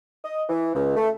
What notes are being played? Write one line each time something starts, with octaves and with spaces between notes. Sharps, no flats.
D#5
E3
C#2
A3